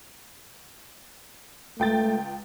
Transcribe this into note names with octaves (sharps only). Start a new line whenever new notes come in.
C#2 A3 G5 A6